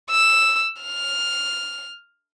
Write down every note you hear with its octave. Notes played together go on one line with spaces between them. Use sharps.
E6
F6